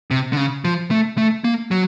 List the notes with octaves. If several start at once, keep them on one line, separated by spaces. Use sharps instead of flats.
C3
D3
C#3
F3
A3
A3
A#3
F#3